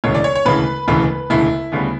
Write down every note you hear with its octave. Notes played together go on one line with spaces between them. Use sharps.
E1 D2 C#3 E3 C#5
D5
C#5
C#5
E1 D2 C#3 E3 B4
E1 D2 C#3 E3
E1 D2 C#3 E3 E4
D2 C#3 G3 B3